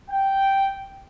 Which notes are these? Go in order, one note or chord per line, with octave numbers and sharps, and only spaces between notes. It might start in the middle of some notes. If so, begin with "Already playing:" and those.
G5